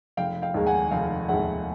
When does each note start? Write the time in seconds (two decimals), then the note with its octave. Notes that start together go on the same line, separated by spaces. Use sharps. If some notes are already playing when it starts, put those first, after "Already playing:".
0.17 F1 F5 G5
0.42 F5 G5
0.54 D#2 D#3 G#3
0.66 F#5 G#5
0.91 F1 F5 G5
1.29 D#2 D#3 G#3 E5 F#5